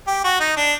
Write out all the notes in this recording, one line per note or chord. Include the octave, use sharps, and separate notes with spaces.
G4
F#4
D#4
D4